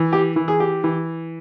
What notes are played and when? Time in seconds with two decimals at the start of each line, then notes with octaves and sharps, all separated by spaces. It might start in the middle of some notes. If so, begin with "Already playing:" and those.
Already playing: E3
0.13 G4
0.36 E3
0.48 G#4
0.60 G4
0.84 E3